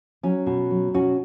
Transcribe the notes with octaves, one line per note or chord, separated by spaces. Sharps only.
F#3 C#4
B2
F#3
B2 C#4 F#4